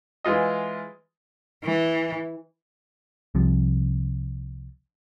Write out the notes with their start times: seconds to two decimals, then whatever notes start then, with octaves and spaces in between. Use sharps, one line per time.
0.24 E3 G#3 F4 D#5
1.64 E3
3.35 C2 C3 F3